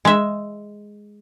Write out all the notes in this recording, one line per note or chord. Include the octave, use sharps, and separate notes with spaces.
G#3 E5